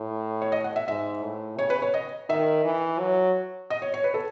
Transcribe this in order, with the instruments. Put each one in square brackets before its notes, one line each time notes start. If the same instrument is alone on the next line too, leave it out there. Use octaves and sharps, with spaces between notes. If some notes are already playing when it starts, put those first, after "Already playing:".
Already playing: [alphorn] A2
[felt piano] C#5
D#5
F#5
E5
[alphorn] G#2 [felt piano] E5
[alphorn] A2
[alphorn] C#3 [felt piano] C#5
[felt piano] B4
C#5
D#5
[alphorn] D#3 [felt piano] E5
[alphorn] E3
F#3
[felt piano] D#5
C#5
C#5
B4
A4